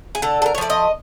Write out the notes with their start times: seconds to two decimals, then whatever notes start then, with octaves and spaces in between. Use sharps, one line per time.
0.15 G#4
0.22 D3 A4
0.42 A4
0.46 A#4
0.55 C#5
0.58 F3 A3 D5
0.70 D#5